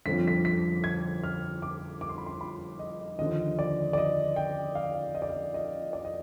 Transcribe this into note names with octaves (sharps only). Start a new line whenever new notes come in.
G1 F2 D3 F3 B6
B6
B6
G#6
F6
D6
D6
C6
B5
C6
B5
D#5
D#2 D3 F3 D#5
D5
D5
D#5
G5
F5
D#5
D5
D#5
D#5
D5
D#5